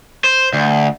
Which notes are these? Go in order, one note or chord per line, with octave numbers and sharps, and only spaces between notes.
C5
D2